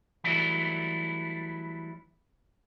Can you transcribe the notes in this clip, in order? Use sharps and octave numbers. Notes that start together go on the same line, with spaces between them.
E3 F#3 G3 A3 D4 E4